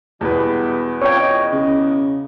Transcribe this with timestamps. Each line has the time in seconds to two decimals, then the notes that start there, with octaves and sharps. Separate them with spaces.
0.21 E2 B2 G3 G#3 B3 B4
1.02 C3 D4 F4 C#5 G5
1.20 D#5
1.52 C#3